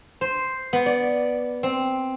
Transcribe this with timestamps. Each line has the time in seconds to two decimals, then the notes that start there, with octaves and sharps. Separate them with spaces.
0.21 C5
0.73 B3
0.86 D5
1.63 C4